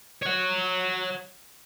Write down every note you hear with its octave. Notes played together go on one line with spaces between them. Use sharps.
C#5 F#5